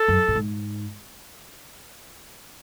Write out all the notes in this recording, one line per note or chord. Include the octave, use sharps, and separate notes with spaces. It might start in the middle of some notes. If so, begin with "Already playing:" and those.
Already playing: A4
F#2
A2
G#2